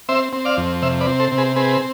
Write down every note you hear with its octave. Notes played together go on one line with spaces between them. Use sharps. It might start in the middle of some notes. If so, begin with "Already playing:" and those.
C4 C5 E5
C4
D5 F5
F2
C3 C5 E5
B4 D5
C4
A4 C5
C3
G#4 B4
C4 G#4 B4